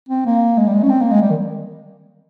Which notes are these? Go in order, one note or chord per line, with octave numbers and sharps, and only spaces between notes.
C4
A#3
G#3
G3
G#3
C#4
C4
A#3
G#3
G3
D#3